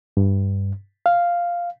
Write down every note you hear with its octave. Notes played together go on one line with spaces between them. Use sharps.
G2
F5